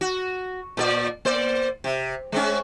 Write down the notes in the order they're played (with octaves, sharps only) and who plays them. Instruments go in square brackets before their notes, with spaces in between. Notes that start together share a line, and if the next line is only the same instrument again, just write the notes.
[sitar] F#4
A#2 A4 D5
A#3 C5 D5
C3
G#3 C4 C#4